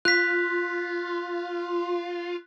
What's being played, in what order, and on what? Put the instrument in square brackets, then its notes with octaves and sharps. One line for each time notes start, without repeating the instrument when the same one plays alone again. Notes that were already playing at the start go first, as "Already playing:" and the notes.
[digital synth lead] F4 [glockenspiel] F#6 B6